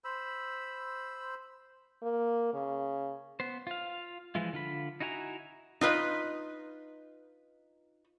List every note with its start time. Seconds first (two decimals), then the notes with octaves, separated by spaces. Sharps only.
0.04 C5 B5 E6
2.02 A#3
2.53 C#3
3.40 B3 C5
3.67 F4 F5
4.35 E3 F3 G#3 E4 F4
4.53 D3 F4 B5
5.00 D#4 E4 F#4 G#5 A#5
5.81 D#4 F4 B4